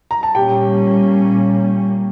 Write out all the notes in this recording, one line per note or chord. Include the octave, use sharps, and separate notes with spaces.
A#5
A5
A#2 G3 A#3 C#4 G4 G5